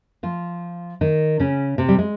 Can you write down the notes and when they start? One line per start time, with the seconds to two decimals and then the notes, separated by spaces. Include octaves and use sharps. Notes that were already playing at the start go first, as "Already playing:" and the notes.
0.23 F3 F4
1.01 D#3 D#4
1.39 C#3 C#4
1.78 C3 C4
1.89 G3
1.99 G#3